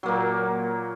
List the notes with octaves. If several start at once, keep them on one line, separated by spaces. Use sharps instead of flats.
A#2 F#3 A#3